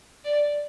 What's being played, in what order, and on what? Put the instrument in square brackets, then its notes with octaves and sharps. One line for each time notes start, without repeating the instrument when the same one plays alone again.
[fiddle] D5